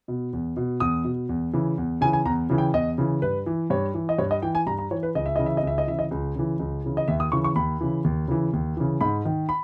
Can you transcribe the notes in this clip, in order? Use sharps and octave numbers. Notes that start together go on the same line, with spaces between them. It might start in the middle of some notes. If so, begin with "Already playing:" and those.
B2
E2
B2
E2 D#6
B2
E2
C#3 E3
E2
C#3 E3 G#5
G#5
E2 A#5
C#3 E3
G5
E2 D#5
C#3 E3
G2 B4
E3
G2 C#5
E3
D#5
G2 C#5
D#5
E3 G5
G#5
G2 A#5
A#5
E3 C#5
B4
C#2 D#5
E5
C#3 E3 D#5
E5
D#5
C#2 E5
D#5
C#3 E3 E5
D#5
C#2
C#3 E3
C#2
C#3 E3
D#5
D#2 E5
D#6
C#3 E3 C#6
C#6
D#2 B5
C#3 E3
D#2
C#3 E3
D#2
C#3 E3
G#2 B5
D#3
B5